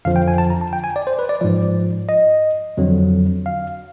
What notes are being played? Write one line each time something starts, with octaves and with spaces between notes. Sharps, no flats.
F2 D3 F3 F5
G5
G#5
A5
A#5
A5
G5
G#5
D5
C5
B4
D5
G#2 F3 D5
D#5
F2 D3 F#3
F5